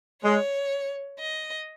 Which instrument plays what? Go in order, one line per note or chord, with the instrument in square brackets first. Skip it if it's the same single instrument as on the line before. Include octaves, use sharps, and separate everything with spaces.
[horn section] G#3 [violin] C#5
[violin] D#5